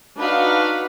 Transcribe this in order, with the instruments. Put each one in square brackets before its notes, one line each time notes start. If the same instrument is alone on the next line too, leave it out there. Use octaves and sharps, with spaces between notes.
[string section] D4 D#4 F#4 B4 F5 F#5